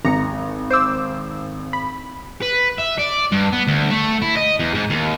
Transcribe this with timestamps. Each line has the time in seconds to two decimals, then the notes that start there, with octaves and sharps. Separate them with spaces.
0.05 G#1 A#5 C#7
0.71 C5 D6 E6
1.73 B5
2.43 B4
2.79 E5
2.99 D5
3.32 G2
3.53 B3
3.68 D2
3.91 A3
4.22 E4
4.37 D#5
4.60 E2
4.75 G#2
4.90 D#2